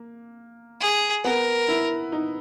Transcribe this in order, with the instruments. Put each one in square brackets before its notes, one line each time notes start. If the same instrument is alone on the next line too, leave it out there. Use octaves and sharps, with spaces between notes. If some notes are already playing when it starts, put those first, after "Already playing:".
Already playing: [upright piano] A#3
[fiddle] G#4
[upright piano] B3 [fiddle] A#4
[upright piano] E4
D#4